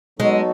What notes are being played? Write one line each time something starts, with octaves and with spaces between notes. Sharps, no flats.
F#3 G#3 B3 D#4 F#4 A4